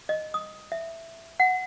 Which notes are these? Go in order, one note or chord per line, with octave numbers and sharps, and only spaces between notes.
D#5
D#6
E5
F#5